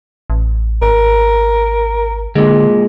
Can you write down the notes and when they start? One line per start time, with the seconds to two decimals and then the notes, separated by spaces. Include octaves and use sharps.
0.30 A1
0.82 G#1 A#4
2.35 A#2 D3 G#3